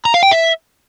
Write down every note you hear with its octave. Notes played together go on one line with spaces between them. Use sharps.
A#5
F5
G5
E5